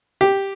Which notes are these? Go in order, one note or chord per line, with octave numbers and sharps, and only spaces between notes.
G4